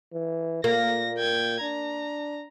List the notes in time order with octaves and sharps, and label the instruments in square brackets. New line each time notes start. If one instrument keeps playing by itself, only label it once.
[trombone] E3
[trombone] A#2 [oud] A#3 [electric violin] A#6
[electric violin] G5 G#6
[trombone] D4 [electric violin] A#5